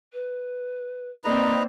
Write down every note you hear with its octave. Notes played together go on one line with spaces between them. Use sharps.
B4
A#3 C4 D#4 B4 D5 A#5